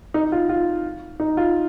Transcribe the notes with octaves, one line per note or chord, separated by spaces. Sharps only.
D#4
F4
F4
D#4
F4